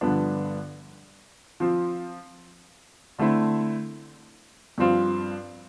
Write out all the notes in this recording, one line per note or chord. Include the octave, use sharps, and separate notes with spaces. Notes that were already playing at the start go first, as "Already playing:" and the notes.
G2 D3 F3 B3 D4
F3 C4 F4
D3 A3 C4 E4
G2 F3 C4 F4